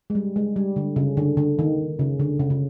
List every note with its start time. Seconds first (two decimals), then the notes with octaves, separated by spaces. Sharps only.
0.10 G#3
0.15 G3
0.36 G#3
0.56 G3
0.76 D3
0.96 C#3
1.17 D3
1.37 D3
1.59 D#3
1.99 C#3
2.20 D3
2.40 C#3
2.50 C#3